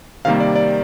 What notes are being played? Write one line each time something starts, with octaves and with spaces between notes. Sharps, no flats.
C3 D#3 G3 A#3 F5
D5
D5